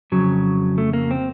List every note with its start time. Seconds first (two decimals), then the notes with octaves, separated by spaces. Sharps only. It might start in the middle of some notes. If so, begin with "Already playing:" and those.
0.12 F2 C#3 F#3
0.78 A3
0.93 A#3
1.11 C4